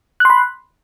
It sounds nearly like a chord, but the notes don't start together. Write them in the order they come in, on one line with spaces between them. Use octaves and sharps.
F#6 C6 B5